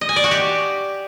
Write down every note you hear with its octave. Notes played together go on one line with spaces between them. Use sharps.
D#5
G#5
D5
F#4
G4